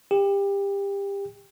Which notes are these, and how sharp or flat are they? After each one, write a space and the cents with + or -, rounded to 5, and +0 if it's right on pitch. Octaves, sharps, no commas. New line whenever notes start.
G4 +25